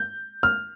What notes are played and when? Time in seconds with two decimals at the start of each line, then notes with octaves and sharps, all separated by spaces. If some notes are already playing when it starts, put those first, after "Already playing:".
Already playing: G6
0.43 F6